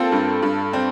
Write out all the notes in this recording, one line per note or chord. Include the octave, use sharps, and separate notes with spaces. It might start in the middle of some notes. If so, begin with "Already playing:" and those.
Already playing: A#3 C4 F4 A4
G2
G2
C4